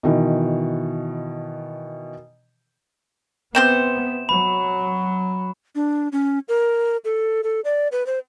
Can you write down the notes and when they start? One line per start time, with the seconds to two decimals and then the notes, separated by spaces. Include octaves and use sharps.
0.03 B2 D#3 E3
3.55 C3 B3 C4 C5 E7
4.29 F#3 B5
5.75 D4
6.12 C#4
6.49 A#4
7.05 A4
7.43 A4
7.65 D5
7.92 B4
8.06 C5